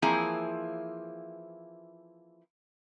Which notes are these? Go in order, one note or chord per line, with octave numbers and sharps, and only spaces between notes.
E3 F3 A#3 C4 E4 G#4